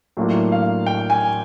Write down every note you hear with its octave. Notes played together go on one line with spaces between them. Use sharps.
A2 F#3 A#3 D4 F4 E5
F5
G5
G#5